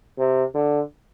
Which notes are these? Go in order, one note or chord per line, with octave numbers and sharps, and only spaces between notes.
C3
D3